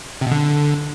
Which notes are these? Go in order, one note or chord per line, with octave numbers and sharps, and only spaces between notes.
C3
B2
D3